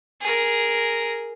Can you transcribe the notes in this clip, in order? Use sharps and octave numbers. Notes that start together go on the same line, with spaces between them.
G#4 A#4